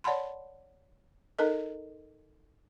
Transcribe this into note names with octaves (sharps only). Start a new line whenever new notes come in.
C#5 D5 F#5 A5 B5 C6
D#4 A4 A#4 D#5